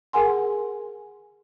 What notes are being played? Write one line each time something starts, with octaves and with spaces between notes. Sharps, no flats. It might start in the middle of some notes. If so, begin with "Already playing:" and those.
G#4 A#4 F#5 G#5 C6